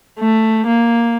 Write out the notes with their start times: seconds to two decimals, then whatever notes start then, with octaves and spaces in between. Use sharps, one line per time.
0.19 A3
0.66 A#3